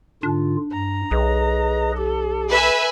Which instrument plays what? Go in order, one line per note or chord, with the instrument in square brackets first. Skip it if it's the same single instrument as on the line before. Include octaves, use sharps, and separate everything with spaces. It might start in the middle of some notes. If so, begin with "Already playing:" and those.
[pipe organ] G#2 D3 F4 [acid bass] D4
[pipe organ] G2 [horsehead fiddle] A#5
[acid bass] B1 [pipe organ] G#4 B4 D#5
[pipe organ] G4 [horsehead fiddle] A4
[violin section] B4 E5 G#5